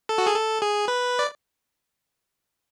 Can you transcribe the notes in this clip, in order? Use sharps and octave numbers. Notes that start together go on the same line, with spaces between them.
A4
F#4
G#4
A4
G#4
B4
D5